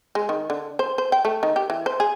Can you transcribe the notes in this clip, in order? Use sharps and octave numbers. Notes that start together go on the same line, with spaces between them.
G#3
D#3
D3
C5
C5
G5
A3
D#3
G4
E3
C5
G#4